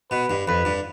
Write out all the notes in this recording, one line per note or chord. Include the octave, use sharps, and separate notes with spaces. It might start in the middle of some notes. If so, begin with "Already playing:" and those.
B2 B4
G2
F2 B4
G2